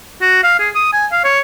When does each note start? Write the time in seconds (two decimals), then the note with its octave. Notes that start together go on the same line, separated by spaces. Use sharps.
0.21 F#4
0.44 F5
0.59 G#4
0.75 D#6
0.93 G#5
1.12 F5
1.24 C#5